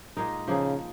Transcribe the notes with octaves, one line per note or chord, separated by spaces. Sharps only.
A#2 G#3 D#4 A#4
C#3 F3 A#3 D#4 G#4